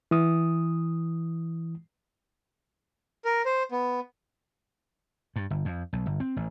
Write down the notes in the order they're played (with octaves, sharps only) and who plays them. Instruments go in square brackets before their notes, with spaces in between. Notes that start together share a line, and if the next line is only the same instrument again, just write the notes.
[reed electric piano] E3 D#6
[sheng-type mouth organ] A#4
C5
B3
[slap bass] G2
G1
F2
B1
G1
C4
A1